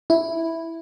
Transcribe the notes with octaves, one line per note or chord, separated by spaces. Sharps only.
E4